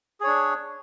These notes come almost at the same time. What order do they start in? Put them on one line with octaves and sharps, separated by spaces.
G#4 C#5 D4